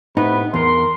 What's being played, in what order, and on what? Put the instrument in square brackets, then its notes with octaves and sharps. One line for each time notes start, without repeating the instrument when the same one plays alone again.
[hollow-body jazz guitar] A2 D#4 [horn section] C3 B3 B5
[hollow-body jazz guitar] E2 [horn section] A#4 C6